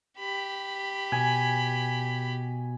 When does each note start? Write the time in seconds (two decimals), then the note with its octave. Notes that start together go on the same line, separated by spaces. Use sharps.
0.19 G4 B5
1.12 B2 G#5